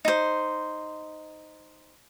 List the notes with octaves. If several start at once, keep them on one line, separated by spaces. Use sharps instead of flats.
D#4 C5